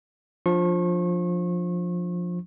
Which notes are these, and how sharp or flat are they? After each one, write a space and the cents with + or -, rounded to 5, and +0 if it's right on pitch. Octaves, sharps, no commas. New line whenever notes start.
F3 +15 D4 +10 C#6 -35